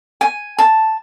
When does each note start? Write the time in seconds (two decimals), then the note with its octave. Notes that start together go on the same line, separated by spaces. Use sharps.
0.21 G#5
0.58 A5